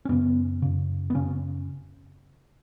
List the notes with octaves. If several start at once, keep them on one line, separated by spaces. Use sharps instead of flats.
C#4
F#2 C#3 B3
F#2 C#3
B3
F#2 C#3 C#4